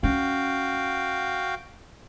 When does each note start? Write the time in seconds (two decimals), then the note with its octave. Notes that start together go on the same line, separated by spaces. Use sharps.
0.03 C#4 F#4 F5 G5